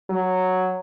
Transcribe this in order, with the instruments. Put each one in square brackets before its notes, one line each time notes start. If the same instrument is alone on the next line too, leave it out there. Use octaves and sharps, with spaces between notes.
[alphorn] F#3